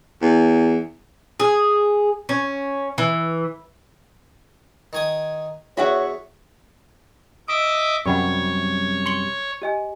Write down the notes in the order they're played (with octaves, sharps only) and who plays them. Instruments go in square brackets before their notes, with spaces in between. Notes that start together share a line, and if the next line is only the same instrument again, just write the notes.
[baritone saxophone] E2
[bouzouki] G#4
C#4
E3
[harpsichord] D#3 G#5 D#6
[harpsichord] E2 [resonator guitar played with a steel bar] F#4 E5 F#5 [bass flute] C#5
[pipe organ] D#5 E5 D6 [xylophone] D#6
[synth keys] F#2 C3 G3 [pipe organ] C#5 [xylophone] F#5 B5 C#6
[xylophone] C6 C#7 G7
G4 D#5 G#5